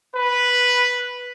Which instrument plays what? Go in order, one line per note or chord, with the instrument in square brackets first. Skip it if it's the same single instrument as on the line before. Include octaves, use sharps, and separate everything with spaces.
[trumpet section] B4